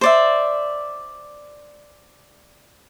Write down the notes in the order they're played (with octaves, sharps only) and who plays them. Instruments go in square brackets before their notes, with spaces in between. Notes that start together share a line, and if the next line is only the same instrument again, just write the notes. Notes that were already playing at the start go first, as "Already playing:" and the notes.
[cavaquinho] C5 D5 E5